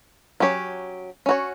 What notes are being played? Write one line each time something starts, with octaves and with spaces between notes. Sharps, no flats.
F#3 C#4 G4 C#5
C#4 F#4 C#5